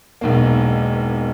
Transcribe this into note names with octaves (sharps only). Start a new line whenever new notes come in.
E1 B1 A#3